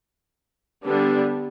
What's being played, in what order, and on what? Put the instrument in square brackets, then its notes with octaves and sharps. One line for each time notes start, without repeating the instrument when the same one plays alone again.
[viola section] D3 G3 B3 D4